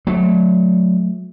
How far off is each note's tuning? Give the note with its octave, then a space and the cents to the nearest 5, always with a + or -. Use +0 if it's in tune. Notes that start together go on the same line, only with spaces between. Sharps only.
F#3 -30 A3 -20